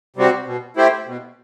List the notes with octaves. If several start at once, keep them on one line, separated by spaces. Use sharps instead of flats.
C3 G3 C4 F#4
B2
A3 E4 G4 C5
B2